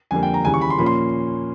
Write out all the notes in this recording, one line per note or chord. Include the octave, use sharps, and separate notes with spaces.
F2 D3 G3 A#3 G#5
G5
A#5
D#2 C#3 E3 G3 G#5
C#6
B5
C6
A#2 F3 A#3 C#4 B5
C6